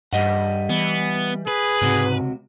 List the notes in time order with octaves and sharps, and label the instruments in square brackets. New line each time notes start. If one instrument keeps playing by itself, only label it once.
[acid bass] G2 [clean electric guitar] G3 D#5 F#5
[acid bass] E3 [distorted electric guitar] B3
[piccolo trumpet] G#4 [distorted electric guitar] B4
[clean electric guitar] C#2 C3 F#4 [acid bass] G#2